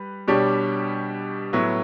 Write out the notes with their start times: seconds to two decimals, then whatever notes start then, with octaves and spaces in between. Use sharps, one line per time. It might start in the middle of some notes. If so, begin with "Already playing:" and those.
Already playing: G3 B4
0.28 B2 G3 D4 G4 C#5
1.53 A2 F#3 B3 E4